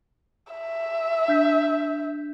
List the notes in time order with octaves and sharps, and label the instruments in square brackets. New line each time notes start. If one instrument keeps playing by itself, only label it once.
[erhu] E5
[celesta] D4 G6 B6